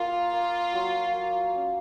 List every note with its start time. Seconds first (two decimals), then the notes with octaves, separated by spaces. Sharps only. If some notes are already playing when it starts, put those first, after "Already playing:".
Already playing: A#3 F4
0.33 A#3
0.73 F#3
1.14 A#3
1.55 C#4